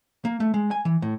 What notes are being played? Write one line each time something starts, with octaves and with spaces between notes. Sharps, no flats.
A#3
A3
G#3
G#5
E3
A2